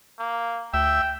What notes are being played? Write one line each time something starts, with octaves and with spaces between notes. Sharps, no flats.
A#3
D2 E5 G5